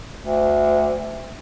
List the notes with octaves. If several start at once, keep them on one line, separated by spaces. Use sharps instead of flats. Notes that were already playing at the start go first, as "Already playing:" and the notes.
D2